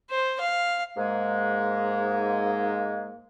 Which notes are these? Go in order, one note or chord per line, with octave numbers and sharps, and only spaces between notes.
C5
F5
G#2 G#3 A#3